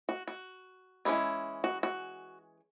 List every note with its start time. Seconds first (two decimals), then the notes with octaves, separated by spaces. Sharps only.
0.09 F#4
0.28 F#4
1.05 E3 G#3 C#4 E4
1.64 F#4
1.83 F#4